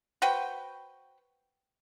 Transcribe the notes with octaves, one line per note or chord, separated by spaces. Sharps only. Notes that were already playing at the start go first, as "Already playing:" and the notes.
F#4 B4 C5 G5